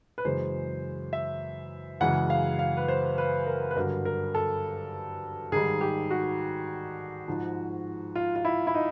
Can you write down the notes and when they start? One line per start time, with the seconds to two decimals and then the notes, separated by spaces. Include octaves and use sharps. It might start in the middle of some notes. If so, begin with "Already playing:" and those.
0.18 B4
0.25 F#2 C#3 E3 G#3 C5
1.13 E5
2.00 F#2 C#3 E3 G#3 F#5
2.30 F5
2.59 F5
2.77 B4
2.88 C5
3.18 B4
3.47 A#4
3.71 B4
3.76 G2 D3 F#3 A#4
4.05 A#4
4.35 A4
5.52 G#2 D#3 G3 G#4
5.81 G4
6.11 F#4
7.28 G#2 F3 G#3
8.15 F4
8.36 F4
8.45 E4
8.67 E4
8.74 D#4